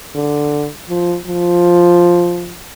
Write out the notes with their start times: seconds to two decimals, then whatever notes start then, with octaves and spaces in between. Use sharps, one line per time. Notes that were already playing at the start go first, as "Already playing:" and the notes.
0.15 D3
0.89 F3
1.26 F3